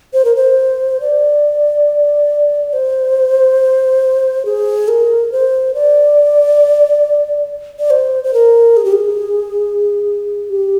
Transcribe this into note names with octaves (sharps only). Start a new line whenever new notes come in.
C5
A#4
C5
D5
C5
G#4
A#4
C5
D5
D5
C5
C5
A#4
G#4
G4
G#4
G4